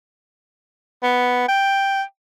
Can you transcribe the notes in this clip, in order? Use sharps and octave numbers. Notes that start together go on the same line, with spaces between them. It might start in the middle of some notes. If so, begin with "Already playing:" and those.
B3
G5